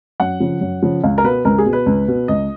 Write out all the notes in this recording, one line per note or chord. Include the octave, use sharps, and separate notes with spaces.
F#2 F#5
C#3 F3
F#2
C#3 F3
C#2 F5
A#4
B2 B4
C#2 A#4
G#4
B2
B4
C#2
B2
C#2 D#5